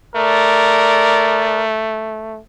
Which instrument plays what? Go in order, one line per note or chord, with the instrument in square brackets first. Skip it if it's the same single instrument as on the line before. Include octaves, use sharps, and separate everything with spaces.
[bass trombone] A3 [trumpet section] A#4 D5